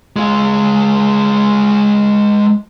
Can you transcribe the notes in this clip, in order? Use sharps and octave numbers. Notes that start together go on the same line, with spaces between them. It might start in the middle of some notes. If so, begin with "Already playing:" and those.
G#3 F4